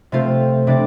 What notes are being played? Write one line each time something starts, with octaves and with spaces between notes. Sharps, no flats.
C3 A3 C4 F4 C5
C3 G3 D4 A4 D5